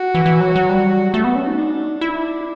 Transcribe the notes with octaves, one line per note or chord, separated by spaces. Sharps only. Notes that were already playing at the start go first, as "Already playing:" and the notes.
Already playing: F#4
E3
E3
F#3
F#3
G3
A3 F#4
B3
C#4
D#4
D4
E4